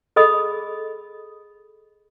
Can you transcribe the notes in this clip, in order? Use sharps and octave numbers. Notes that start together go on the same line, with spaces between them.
G#4 A4 D#5 B5 D#6